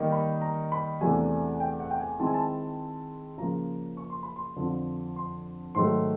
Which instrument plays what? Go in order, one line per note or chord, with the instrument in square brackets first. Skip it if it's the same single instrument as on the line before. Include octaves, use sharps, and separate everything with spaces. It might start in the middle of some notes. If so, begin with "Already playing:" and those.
Already playing: [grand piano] D#3 G3 A#3 D#4
B5
A#5
B5
E2 C3 E3 A3 D4 G#5
G5
F#5
G5
G#5
D#3 G#3 C4 E4 A5
G#5
A5
C#3 F3 A#3 A#5
C#6
C6
B5
C6
F2 D3 F3
C6
G#2 D#3 F#3 A3 C6